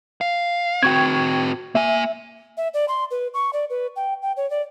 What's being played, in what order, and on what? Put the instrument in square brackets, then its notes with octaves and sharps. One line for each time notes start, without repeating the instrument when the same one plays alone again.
[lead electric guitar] F5
[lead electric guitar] C4 F#4 [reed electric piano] G5 C#6 G#6
[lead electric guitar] A#3 G#5 [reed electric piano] E5
[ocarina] E5
D5
C6
B4
C#6
D5
B4
G5
G5
C#5
D5